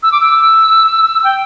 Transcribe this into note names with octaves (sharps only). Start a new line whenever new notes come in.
E6
D6
E6
G5